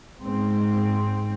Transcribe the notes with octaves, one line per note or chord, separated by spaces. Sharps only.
G#2 C4